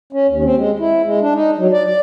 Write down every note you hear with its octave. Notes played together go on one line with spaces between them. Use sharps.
C#4
D#2
C4
G#3
E4
G#3
D4
D#4
F#3
D5
D5